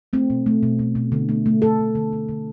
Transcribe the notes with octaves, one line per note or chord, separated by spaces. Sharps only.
A3 C4
B2
A3
B2
B2
B2
D3
A3
A3
A3 A4
D3
D3
D3
D3